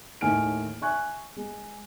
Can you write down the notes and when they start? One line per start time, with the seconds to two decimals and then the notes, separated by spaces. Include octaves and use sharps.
0.21 D#2 A2 D#4 G#5 F6 D7
0.82 E5 G#5 C#6 F#6 G#6
1.36 G#3